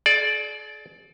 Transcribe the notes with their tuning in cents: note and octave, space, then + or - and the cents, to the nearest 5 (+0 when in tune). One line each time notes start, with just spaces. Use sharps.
G#4 +45 D5 +0